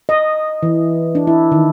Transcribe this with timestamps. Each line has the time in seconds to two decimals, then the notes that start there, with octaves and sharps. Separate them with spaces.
0.09 D#5
0.63 E3
1.15 D4
1.27 E4
1.52 D#3